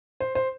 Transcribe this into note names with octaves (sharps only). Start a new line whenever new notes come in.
C5
C5